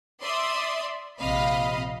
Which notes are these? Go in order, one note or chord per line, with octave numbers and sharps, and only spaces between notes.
D5 E5 C6 D#6
A#1 C3 D#5 F5 B5